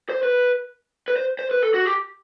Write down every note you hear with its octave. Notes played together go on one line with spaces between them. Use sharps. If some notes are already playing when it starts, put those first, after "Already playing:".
C5
B4
B4
C5
C5
B4
A4
F#4
G4